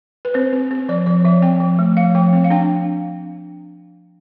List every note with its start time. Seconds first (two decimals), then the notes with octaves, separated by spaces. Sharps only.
0.25 B4
0.34 C4 C5
0.53 C4
0.71 C4
0.89 F3 D5
1.06 F3 D5
1.25 F3 E5
1.42 C4 G5
1.60 F3
1.79 A3
1.97 F3 F5
2.15 F3 G5
2.33 C4
2.44 F5
2.50 D4 G5